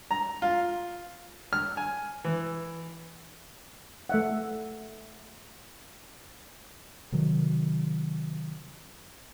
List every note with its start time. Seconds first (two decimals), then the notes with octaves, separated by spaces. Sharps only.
0.11 A#5
0.42 F4
1.53 F6
1.77 G#5
2.24 E3
4.09 A3 E5 F#5
7.12 C3 D#3 F#3